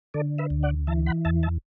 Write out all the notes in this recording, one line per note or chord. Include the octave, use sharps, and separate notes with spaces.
D3 A4 D5
B4 E5
D2
D5 F#5
E3 E5 A5
F#5 B5
E2 E5 A5
E5 A5